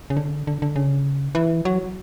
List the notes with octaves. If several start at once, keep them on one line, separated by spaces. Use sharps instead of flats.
C#3
D3
D3
D3
C#3
E3
F#3